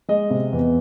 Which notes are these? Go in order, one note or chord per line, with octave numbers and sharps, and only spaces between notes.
G#3 D#5
C3
E2